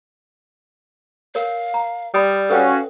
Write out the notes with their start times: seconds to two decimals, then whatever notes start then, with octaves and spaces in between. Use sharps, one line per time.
1.35 A#4 C#5 F5
1.74 A#5
2.14 G3 D5 B5 D#6
2.49 C#4 F#4 A4 B4 F5 G5